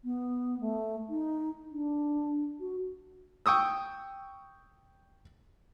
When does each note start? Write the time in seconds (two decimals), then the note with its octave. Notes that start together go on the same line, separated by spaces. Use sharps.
0.04 B3
0.60 A3
1.09 D#4
1.71 D4
2.60 F#4
3.46 G5 C#6 D#6 E6